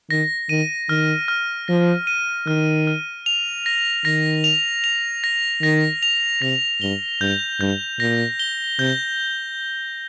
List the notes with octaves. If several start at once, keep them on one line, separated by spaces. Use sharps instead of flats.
D#3 A#6
D#3 D#7
D#3 F6
F6
F3 A#6
D#7
D#3 F6
F6
F7
A#6
D#3 A#6
F7
F7
A#6
D#3 A#6
F7
C3 A#6
G2 G7
G2 G6
G2 G6
A#2 A#6
G7
C3 G6